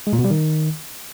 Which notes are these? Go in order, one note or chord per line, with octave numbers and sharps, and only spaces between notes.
G#3
A#2
B2
G3
D#3